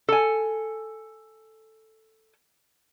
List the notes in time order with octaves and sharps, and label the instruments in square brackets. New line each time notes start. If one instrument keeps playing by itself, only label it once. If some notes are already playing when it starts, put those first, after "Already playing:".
[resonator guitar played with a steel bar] A4 G#5